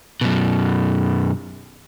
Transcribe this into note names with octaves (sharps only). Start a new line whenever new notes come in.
F#2 B2